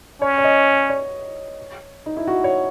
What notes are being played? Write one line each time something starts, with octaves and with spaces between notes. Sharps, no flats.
C#4 C#5
C#5
D#5
C#5
D#4
E4
F#4
C#5